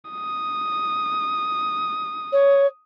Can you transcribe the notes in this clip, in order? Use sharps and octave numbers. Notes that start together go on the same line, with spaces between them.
D#6
C#5